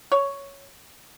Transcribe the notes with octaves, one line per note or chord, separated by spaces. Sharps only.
C#5